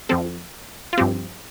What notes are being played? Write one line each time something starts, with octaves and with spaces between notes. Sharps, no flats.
F2 F3 C4 A4
F4
G2 F3 C4 G4